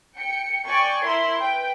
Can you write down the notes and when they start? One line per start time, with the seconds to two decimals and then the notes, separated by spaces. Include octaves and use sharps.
0.17 G5 C#7
0.66 D5 G5 G#5 C#6
1.05 E4 A#4 C6
1.40 B4 G5